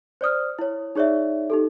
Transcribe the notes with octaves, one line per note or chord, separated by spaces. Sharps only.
C5 D5 D#6 F6
E4 C#5
D#4 G#4 C#5 D5 E5
D#4 G4 A4